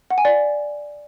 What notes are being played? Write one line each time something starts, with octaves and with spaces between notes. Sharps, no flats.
F#5
G#5
D5